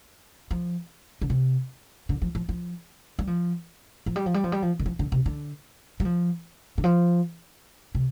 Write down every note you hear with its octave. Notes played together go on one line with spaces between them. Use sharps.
F3
D3
C3
D3
F3
F3
F3
G3
F3
F3
G3
F3
G3
F3
G3
F3
D3
F3
D3
C3
D3
G3
F3
D3
F3
C3